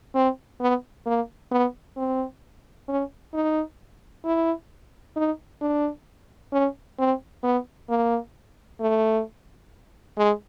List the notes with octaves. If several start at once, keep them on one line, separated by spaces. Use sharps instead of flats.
C4
B3
A#3
B3
C4
C#4
D#4
E4
D#4
D4
C#4
C4
B3
A#3
A3
G#3